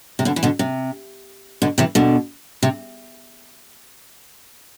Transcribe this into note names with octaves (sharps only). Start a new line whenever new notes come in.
C3
B2 D3
E3
B2 D3
C3
B2 D3
C3 E3
B2 D3
C3